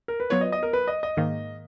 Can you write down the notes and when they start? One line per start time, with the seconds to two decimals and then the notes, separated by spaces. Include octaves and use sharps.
0.08 A#4
0.20 B4
0.30 F#3 B3 F4 B4 C#5
0.41 D#5
0.52 D#5
0.63 A#4
0.73 B4
0.88 D#5
1.03 D#5
1.17 G#2 D#3 A#3